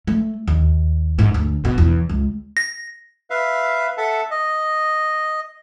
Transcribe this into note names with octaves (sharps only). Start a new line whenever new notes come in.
A3
D#2
G#2
D2
B2
E2
C#2
A#6
B4 E5 F5
A4 E5 F#5 A5
D#5